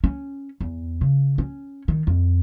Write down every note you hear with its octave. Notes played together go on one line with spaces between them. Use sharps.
C#4
E2
C#3
C#4
D#3
F2